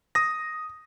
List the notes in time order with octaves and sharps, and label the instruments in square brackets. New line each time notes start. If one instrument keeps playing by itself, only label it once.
[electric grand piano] D#6 A#6